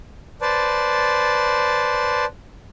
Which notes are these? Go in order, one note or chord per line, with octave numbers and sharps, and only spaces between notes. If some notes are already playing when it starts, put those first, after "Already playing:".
B4 C5 D5 A5